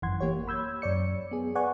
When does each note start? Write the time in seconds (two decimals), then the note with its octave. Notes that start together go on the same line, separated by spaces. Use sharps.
0.02 G#1 F#2 E3 F#5 C6 G#6
0.21 A#3 G4 C#5
0.48 B5 E6 G6 G#6
0.82 F#2 C#5 D5 C#7
1.31 B3 G#4
1.55 B4 D5 F#5 G#5 C#6